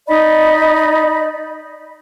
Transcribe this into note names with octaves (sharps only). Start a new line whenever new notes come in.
D#4 D5 D#5 B5